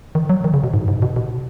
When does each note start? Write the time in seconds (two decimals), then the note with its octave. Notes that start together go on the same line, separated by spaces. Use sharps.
0.15 D#3
0.30 F#3
0.44 D#3
0.54 C#3
0.64 B2
0.74 G#2
0.88 G#2
1.02 B2
1.16 B2